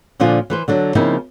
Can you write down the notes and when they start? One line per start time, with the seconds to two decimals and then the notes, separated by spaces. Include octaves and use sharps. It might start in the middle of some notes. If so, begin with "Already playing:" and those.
0.20 A#2 D3 F3 D4 F4 G#5
0.50 E3 B4 C5
0.68 D3 F#3 D4
0.95 C#3 F3 A#3 C4 D#4 E4